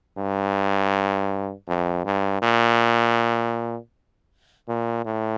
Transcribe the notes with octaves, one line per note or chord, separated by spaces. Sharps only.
G2
F2
G2
A#2
A#2
A2